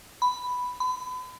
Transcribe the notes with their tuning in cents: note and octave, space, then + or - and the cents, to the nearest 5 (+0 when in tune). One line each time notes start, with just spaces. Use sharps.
B5 +5
B5 +35